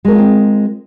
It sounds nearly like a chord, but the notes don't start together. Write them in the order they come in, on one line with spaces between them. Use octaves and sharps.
G#3 A#4 D4 F4 C4